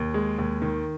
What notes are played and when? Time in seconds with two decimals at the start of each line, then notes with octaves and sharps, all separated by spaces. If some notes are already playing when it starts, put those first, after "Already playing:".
Already playing: D#2
0.14 G#3
0.39 D#2
0.62 D#3